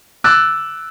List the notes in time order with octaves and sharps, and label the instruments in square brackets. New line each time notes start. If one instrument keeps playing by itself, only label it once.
[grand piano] D6 E6 F#6 A6